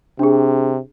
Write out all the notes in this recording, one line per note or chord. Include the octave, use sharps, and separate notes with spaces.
C3 D4 G#4